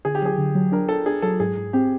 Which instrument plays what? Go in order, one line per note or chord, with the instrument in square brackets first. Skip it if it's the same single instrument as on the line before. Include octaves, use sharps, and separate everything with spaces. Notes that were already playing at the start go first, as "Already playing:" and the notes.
[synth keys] D3 [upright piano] G#4
[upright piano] G4
[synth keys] F#3 [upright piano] G#4
[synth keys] D3
F#3
[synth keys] D4 [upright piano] A#4
[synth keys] D4 [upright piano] A4
[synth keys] D4 [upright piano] G#4
[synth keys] F#3 [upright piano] A4
[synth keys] G#2 [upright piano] G#4
[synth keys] G#2
[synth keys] C4 [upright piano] G4